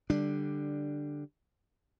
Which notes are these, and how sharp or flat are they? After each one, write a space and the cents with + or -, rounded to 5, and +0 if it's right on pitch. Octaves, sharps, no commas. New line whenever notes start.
D3 +0 G3 +0 D4 +5